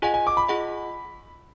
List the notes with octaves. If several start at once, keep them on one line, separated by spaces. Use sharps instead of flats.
F4 G#4 D#5 F#5 G#5
G#5
D6
B5
F4 G#4 D#5 F#5